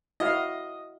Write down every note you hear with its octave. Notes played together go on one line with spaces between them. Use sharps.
E4 F#4 D#5 F5